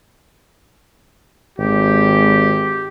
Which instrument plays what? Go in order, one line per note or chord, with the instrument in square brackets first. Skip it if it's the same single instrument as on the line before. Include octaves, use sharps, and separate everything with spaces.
[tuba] G#1 [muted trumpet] G4